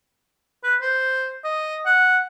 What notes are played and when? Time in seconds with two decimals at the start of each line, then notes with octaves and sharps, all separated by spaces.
0.64 B4
0.81 C5
1.44 D#5
1.86 F#5